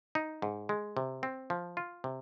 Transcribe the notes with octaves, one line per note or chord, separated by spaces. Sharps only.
D#4
G#2
G#3
C3
C4
F3
F4
C3